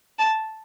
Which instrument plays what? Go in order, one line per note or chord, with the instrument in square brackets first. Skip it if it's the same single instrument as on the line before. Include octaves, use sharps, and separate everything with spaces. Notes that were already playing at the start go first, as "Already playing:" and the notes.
[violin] A5